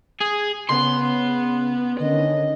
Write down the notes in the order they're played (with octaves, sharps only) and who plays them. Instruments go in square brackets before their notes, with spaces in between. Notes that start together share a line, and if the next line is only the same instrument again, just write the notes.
[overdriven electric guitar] G#4
[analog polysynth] C#3 [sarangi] B3 [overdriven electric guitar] C6
[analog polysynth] D3 D#3 C#4 [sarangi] D#5